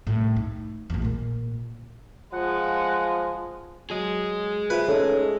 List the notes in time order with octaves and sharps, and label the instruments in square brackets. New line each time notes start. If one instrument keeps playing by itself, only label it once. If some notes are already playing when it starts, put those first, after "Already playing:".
[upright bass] C2 A2
D#4
A#1 E2
A#2 A#3
[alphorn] F3 [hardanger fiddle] G#3 [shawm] F#5
[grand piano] F#3 [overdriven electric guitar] G#4 D#5
[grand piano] F4 C5 E5 [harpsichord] B4
[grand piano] C#4 D#4 C#5 [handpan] A4